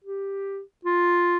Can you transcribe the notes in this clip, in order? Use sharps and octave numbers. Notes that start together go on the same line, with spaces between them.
G4
F4